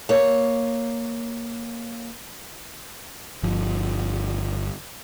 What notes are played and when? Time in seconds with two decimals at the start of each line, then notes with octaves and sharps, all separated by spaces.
0.09 A#3 C#5
3.43 G1 F3